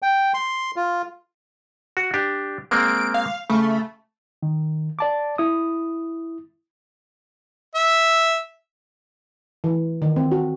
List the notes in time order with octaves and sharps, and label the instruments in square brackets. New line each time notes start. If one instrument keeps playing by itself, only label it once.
[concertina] G5
C6
F4
[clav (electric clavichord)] F#4
D4 G4
[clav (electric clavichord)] G#3 A#3 C4 [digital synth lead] D7
[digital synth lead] F5
[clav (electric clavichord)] C#3 [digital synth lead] A3
[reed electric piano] D#3
D5 A5 D6
E4 D#6
[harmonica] E5
[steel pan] E3
D#3
C4
F#4